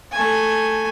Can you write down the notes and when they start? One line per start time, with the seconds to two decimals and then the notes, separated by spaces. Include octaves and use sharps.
0.12 A3 G#5